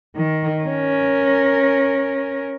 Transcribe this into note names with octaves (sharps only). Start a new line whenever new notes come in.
D#3
C#4 A#4